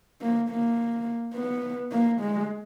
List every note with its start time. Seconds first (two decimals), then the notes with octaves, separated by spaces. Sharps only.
0.21 A#3
0.50 A#3
1.35 B3
1.91 A#3
2.20 G#3